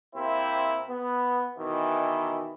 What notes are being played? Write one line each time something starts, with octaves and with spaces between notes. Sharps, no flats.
C3 A#3 C4 E4
B3
B2 D#3 E3